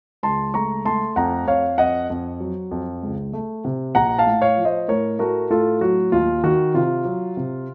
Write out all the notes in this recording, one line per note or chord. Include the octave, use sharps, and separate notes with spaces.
C#2 A5 C6
A3 A#5 C#6
A3 A5 C6
F2 F#5 A#5
F2 C#5 F5
F2 D#5 F#5
F2
F#3
F2
C#2
A3
C3
A#1 F#5 A#5
F5 A5
A2
C#5 F5
F3
C5 D#5
A2 A#4 C#5
A3 F#4 A#4
A2 F4 A4
F#3 F#4
D#2 F4
D#3 F#4
C3 F4
F#3
C3